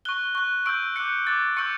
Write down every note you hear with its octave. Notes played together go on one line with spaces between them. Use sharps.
C#6 F#6 G7
C#6 F#6
C#6 E6 G6 D7
D6 F#6 C#7
D6 F#6 A6
C#6 E6 G6 C#7